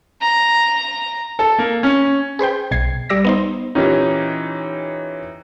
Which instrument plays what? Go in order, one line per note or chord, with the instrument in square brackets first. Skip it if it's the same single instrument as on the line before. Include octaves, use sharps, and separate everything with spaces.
[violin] A#5
[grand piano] A4
A#3
C#4
[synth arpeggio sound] G#4 B4 C5 G5
B1 G#6 C7
G3 D5 E6 A#6
B3 D#4 C5
[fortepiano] A#2 C#4 G4 [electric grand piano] E3 D#4